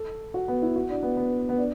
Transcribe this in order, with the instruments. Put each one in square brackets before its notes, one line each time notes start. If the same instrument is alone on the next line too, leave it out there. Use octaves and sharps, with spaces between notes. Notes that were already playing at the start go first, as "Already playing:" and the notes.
Already playing: [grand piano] A4
F#4
B3
E4
F#4
D4
B3
B3
B3
D4